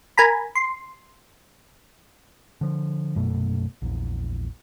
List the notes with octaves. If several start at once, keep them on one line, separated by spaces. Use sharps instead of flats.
A#4 G#5 A#5 B5
C6
D3 F3
A#1 F#2 B2 A3
A#1 E2